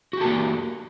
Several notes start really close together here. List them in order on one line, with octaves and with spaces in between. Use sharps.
F#4 G4 A4 A#3